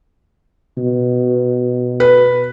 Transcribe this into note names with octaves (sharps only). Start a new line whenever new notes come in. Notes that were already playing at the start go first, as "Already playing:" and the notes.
B2
B4